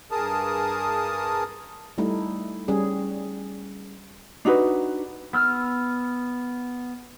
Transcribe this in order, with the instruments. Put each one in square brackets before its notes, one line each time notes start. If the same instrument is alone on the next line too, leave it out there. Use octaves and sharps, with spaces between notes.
[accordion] G2 G#4 A#4 A5 D#6
[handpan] G3 A3 D#4 E4
G3 C#4 G#4
[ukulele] D4 D#4 F#4 B4
[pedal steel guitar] B3 E6 F6